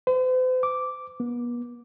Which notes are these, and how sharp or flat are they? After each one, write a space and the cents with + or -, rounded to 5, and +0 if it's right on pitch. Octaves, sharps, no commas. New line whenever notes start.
C5 -45
D6 -5
B3 -40